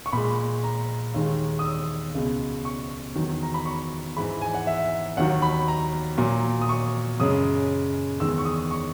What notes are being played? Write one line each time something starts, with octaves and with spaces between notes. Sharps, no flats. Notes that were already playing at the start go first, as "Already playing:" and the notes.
C#6
A#2 G#3 B5
A#5
D#2 D#3 G#3
D#6
E6
C#2 B2 G#3
C#6
E2 D#3 F#3
A#5
B5
C#6
G#2 E3 G#3 B5
G#5
F#5
E5
D#2 D#3 F#3 F#5
B5
A#5
A#2 F#3
D#6
C#6
F#2 C#3 G#3 D#6
E2 D#3 G#3 E6
C#6
D#6
C#6